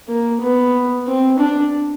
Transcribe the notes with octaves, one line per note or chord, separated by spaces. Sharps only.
A#3
B3
C4
D4